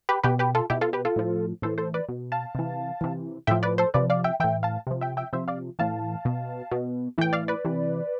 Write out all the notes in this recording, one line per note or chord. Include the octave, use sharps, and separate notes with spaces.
G4 B4
B2 G4 B4
G4 B4
F4 A4
B2 E4 G4
F4 A4
G4 B4
F4 A4
A2 F3
A2 E3 A4 C5
A4 C5
B4 D5
B2
F5 A5
C3 E3
C3 E3
A2 F3 E5 G5
B4 D5
A4 C5
C3 F3 B4 D5
D5 F5
E5 G5
A2 E3 E5 G5
F5 A5
C3 F3
E5 G5
E5 G5
C3 F3 C5 E5
D5 F5
A2 E3 F5 A5
B2
B2
A2 E3 G5
D5 F5
B4 D5
C3 E3